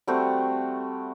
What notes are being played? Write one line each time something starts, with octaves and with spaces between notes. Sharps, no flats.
G3 A3 C4 F#4